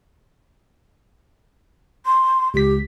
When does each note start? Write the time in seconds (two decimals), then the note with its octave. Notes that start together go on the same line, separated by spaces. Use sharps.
2.05 C6
2.54 C#2 G4 B6